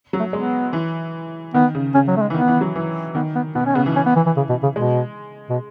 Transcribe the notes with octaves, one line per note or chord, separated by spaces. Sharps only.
F#3
A3
G#3 B3
E3
D#3 B3
C#3
C#3 C#4
F#3
A3
G#3
E3
D#3 B3
E3
F#3
E3
D#3 B3
B3
B2 B3
C#4
C#3 B3
E3
C#4
B3
E3
E3
C#3
B2
C#3
B2 G#3
B2